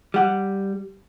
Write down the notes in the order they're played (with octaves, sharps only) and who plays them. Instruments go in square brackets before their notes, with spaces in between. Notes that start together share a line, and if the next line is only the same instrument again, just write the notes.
[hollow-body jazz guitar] G3 F#5